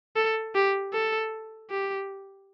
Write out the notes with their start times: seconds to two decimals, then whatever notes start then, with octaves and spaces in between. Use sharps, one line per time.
0.16 A4
0.55 G4
0.93 A4
1.70 G4